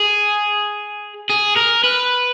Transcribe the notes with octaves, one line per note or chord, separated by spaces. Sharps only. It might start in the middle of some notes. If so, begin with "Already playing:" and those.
Already playing: G#4
G#4
A#4
B4